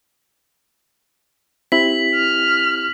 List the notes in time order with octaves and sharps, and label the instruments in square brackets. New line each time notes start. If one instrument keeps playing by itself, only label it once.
[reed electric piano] C4 E4 G4 [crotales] B6 F#7
[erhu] F6